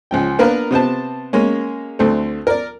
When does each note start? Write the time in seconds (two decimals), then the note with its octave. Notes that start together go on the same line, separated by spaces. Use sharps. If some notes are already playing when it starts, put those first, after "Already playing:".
0.11 C#2 F3 G5
0.39 A#3 B3 D4 A#4 B4 F5
0.71 C3 B3 C5 A5
1.33 G#3 A#3 C#4
1.99 D2 A3 C4
2.47 A#4 D5